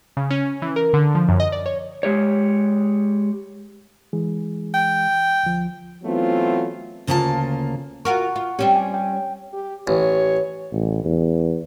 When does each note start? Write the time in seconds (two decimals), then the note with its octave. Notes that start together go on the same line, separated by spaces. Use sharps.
0.17 C#3
0.31 C#4
0.62 E3
0.76 A#4
0.93 D3
1.15 F3
1.29 F#2
1.40 D#5
1.52 D5
1.66 C#5
2.03 G#3 G4 C#5
4.13 E3 G#3 G#4
4.74 G5
5.43 D2 F3
6.03 E3 F#3 A3 B3 C4 F4
7.07 D2 C#3 A#3 F4 C5 A5
8.05 F4 F#4 A#4 F#5 C#6
8.36 F4
8.59 G3 C4 C#4 G4
8.76 G#5
8.94 G5
9.53 G4
9.87 A1 C#5
10.73 A1
11.05 E2